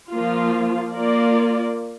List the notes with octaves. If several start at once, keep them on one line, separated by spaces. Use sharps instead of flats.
F3 A#3 F4
A#3 F4 A#4 D5